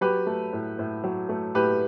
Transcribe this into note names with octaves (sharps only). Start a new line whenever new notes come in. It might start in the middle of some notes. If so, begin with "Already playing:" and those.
F#3 G4 B4
A3
A2
A2
F#3
A3
A2 G4 B4